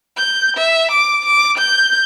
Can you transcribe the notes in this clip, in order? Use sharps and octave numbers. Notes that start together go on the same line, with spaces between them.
G6
E5
D6
D6
G6